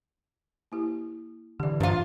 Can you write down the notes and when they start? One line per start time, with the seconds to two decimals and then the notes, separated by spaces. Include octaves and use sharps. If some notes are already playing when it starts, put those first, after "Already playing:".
0.72 A#3 E4 G4
1.60 D3 E3 G4 D5
1.80 G2 D4 F4 C5 A#5